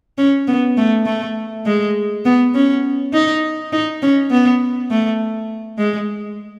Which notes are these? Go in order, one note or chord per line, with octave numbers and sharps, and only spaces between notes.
C#4
B3
A3
A3
G#3
B3
C#4
D#4
D#4
C#4
B3
A3
G#3